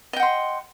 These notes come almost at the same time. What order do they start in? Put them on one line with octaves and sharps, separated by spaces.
D#5 G5 F#5 C6